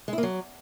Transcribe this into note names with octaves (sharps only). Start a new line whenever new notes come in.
G#3
E4
A#3
F#3